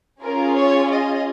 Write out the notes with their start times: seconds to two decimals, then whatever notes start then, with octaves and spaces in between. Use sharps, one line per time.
0.21 C#4 F4 G#4 A#4
0.55 C#5
0.89 D#5